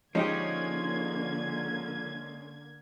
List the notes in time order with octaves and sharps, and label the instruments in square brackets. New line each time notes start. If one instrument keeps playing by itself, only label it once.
[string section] D3 A#3 G#6 [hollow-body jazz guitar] F3 D#4 G4 [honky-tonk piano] G#3 C#4